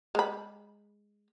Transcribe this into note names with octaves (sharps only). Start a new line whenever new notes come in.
G#3 B5